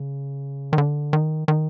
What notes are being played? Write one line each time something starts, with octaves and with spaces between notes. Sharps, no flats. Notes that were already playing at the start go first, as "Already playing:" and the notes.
Already playing: C#3
D#3
D3
D#3
D#3